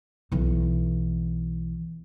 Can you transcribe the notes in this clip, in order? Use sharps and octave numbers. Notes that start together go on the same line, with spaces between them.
B1 E3